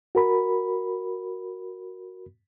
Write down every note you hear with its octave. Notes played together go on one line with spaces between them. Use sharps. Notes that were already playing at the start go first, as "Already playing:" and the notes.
F#4 A#4 B5